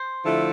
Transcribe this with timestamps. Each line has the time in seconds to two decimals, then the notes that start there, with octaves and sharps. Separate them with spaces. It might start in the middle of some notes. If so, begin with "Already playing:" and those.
Already playing: C5
0.23 D3 F3 A3 E4 A4